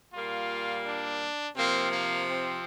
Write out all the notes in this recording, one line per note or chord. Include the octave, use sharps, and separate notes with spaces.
A#2 G3 A#3 F4
D4
C3 F3 A#3 C4
A#3
C4